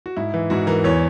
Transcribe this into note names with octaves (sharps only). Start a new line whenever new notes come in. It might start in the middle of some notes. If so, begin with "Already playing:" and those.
F#4
G#2 E4
E3
G#2 F#4
E3 A#4
E2 C#5